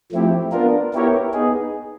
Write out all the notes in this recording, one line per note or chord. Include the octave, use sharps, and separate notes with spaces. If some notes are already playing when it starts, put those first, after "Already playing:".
F3 A3 C4 E4 G4
B3 D4 F4 A#4
B3 E4 G4 A#4 C#5
B3 D#4 G#4